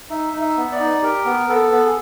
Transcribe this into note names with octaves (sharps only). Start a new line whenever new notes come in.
D#4 E5
D#4
E5
B3
D5
D#4
G4 A#4
B3
B3 A4
B3
G#4